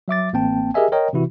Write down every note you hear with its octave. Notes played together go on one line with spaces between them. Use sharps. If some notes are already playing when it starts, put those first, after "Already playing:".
F#3 E5 D6 A6
A1 A#3 C4 G5 A5
G4 G#4 A#4 D#5 E5 G#5
A#4 C#5 D#5 G5 A#5
C3 E3 E4 F#4